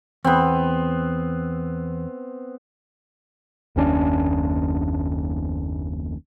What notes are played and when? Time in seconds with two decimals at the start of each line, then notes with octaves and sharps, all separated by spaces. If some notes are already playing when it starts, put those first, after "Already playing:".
0.24 E2 B3 C4
3.76 F#1 D#2 C#4 D4